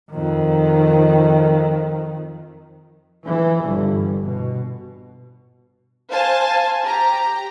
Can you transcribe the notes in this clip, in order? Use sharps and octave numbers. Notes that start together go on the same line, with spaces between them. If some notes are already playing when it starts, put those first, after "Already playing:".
F2 D#3
E3
G1
B2
C5 F5 G#5 A5
G4 A#5